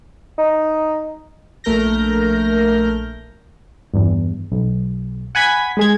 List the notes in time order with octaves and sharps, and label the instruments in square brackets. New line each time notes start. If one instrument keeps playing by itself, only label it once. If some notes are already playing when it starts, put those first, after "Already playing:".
[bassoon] D#4
[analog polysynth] A#1 A3 A#4 F6 G6 A#6
[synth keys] E2 G2
B1
F#5 G#5 B5 G#6 B6
G#3 G#4 G#6